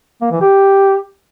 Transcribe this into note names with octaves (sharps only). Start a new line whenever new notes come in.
A#3
E3
G4